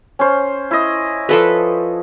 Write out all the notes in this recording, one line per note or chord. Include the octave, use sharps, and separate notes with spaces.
C#4 C5
E4 D#5
F3 A4 B4